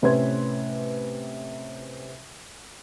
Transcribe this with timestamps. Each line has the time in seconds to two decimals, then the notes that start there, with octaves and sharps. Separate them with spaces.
0.02 A2 C3 C#4 B4 C6 G#6